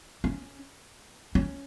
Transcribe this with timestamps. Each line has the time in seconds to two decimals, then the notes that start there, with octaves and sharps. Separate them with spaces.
0.24 C#4
1.35 C#4